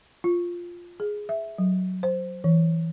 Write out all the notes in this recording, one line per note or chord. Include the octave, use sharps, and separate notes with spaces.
F4
G#4
E5
F#3
C5
E3